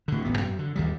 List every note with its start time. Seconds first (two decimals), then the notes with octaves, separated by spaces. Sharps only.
0.08 A2 D3
0.24 D1 A1 B3
0.38 F#2
0.59 D3
0.75 D#2 D#3 G3